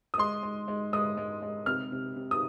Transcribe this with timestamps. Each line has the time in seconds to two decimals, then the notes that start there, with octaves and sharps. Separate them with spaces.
0.14 D#6
0.18 G#3 C6
0.43 G#3
0.68 G#3
0.93 G#3 D#6
1.17 G#3
1.42 G#3
1.66 C3 F6
1.92 C3
2.16 C3
2.31 D#6